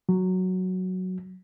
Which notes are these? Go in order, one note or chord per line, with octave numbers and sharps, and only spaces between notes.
F#3